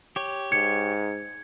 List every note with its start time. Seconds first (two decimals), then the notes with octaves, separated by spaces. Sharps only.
0.16 G4 C#5
0.52 G#2 G#6 C#7